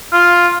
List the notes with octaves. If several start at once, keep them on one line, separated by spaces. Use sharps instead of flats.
F4